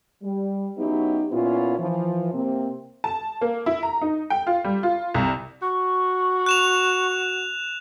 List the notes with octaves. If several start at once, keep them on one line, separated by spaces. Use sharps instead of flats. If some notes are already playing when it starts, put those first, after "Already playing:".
G3
F#3 B3 C#4 D#4 E4 G4
A#2 B3 C#4 E4 F4
E3 F3
C3 A#3 C4
A5
A#3
E4
A#5
D#4
G5
F4
G3
F4
C2
F#4 C#6
F#6 E7 F7